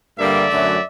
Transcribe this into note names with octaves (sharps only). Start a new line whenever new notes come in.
G2 D3 G3 A#3 D5 E5
F#2 D3 F#3 A3